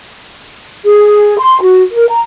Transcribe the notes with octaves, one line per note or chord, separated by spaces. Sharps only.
G#4
C6
F#4
A#4
A#5